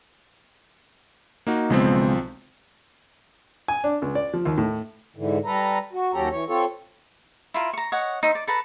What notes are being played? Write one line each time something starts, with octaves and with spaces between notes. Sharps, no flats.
A#3 D#4 F#4
B1 C#3 F3 G#3 B3 C4
G#5
D4
C#2
D5
F3
D#2
A2
G#2 D3 E3
G3 A4 B4 A#5
F#4
D#2 F#3 C#4 G4 A4 A#5
E3 C#5
C4 F4 A4 C#5
E4 F4 A#4
A#5 C#6
C#5 D#5 F#5
D#4 C5 E5
D5
A4 B4 A#5